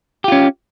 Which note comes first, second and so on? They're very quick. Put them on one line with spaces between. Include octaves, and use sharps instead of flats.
G4 F4 C#4